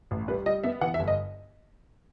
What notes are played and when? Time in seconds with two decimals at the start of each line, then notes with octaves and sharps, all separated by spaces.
0.11 A1
0.28 G3 B4
0.46 G3 D#5
0.64 B3 E5
0.81 E3 F#5
0.94 E5
0.99 G1
1.08 D#5